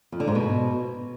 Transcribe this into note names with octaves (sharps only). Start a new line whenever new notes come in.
F2
D3
G#2
B2